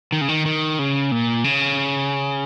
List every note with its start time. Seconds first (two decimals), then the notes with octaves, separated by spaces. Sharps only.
0.12 D#3
0.21 C#3
0.28 D#3
0.46 D#3
0.79 C#3
1.12 A#2
1.44 C#3